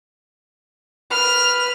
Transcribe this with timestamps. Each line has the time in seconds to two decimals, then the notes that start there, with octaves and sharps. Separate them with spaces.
1.11 B4 F6 F7